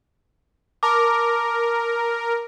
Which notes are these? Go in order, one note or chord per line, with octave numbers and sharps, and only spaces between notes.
A#4 A5 D6